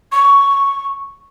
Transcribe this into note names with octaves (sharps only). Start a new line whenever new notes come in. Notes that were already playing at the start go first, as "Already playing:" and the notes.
C#6